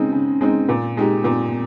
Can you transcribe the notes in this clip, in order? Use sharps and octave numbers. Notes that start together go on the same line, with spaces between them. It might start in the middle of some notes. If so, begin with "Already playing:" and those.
Already playing: C#3 G#3 C4 D#4
C#3
G#3 C4 D#4
A#2
G#3 D#4 G4
A#2